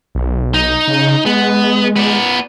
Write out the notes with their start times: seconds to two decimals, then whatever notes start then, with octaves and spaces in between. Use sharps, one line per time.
0.15 B1
0.54 D#4
0.88 C#3
1.26 G#3 B3
1.96 B3 D5